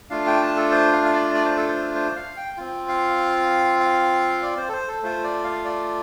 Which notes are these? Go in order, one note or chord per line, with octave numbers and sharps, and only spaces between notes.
A3 D4 F4 F5
G5
A5
A4
C5
F5
F5
D5
D5
C5
A4
C5
C5
F5
G5
C4 F4
F5
F5
D5
C5
A4
C5
A4
A3 F4 C5
D5
F5
D5